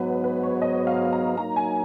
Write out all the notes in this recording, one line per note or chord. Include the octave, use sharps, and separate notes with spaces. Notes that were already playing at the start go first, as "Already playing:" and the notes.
Already playing: G#2 F#3 B3 B4
B4
C#5
D#5
F5
A#5
F#3 A#3 D#4 A#5
G#5